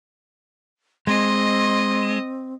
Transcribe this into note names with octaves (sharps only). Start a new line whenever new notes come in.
G#3 C4 D#5 C6